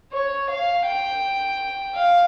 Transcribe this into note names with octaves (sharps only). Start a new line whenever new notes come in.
C#5
F5
G5
F5